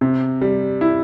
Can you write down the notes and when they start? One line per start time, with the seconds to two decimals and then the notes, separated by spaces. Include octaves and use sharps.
0.01 C3
0.41 G3
0.81 E4